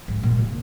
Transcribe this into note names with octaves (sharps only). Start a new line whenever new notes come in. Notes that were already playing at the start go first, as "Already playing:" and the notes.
G#2
A#2
C#3